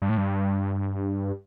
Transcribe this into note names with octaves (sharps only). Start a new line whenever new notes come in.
G2
A2
G2